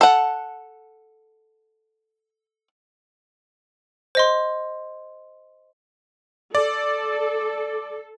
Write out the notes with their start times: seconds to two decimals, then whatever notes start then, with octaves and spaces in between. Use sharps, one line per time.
0.01 A4 F#5
4.15 C5 D#5 C6
6.55 A4 D5